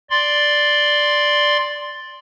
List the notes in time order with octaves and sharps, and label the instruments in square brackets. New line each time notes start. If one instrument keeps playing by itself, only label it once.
[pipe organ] D5 C6